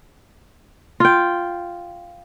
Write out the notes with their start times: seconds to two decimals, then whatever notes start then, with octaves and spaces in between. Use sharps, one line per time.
1.00 F4 G5